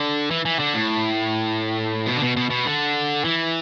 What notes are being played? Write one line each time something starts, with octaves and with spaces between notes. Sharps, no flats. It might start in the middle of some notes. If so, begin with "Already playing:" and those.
Already playing: D3
E3
E3
D3
A2
B2
D3
B2
B2
B2
D3
E3